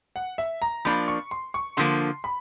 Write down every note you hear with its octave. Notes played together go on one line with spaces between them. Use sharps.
F#5
E5
A#5
F3 A#3 D4 B5
C#6
C6
C#6
D3 F3 A#3 C6
B5